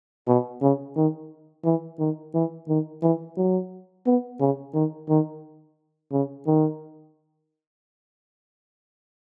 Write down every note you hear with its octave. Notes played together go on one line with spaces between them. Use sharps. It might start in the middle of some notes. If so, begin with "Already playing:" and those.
B2
C#3
D#3
E3
D#3
E3
D#3
E3
F#3
B3
C#3
D#3
D#3
C#3
D#3